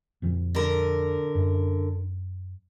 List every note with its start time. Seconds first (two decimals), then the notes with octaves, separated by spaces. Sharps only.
0.22 F2 A#2 F3
0.55 D3 A#4
1.35 F#2